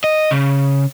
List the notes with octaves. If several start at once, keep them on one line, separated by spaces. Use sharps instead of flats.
D#5
C#3